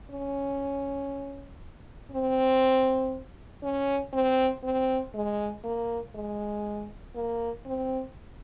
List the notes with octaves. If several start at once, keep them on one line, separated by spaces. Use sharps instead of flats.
C#4
C4
C#4
C4
C4
G#3
A#3
G#3
A#3
C4